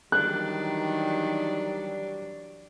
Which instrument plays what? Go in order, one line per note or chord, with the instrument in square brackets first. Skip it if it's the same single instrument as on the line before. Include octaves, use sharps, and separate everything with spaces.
[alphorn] D#3 [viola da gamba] E3 F#3 D4 [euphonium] G3 [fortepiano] F#6